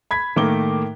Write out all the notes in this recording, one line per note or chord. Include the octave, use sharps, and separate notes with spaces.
B5 G#6 B6
A2 D#3 A3 A#3 D6 G7